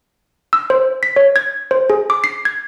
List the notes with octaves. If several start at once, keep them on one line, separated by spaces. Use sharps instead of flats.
E6
C5
B6
C#5
G#6
C5
G#4
D6
C7
G#6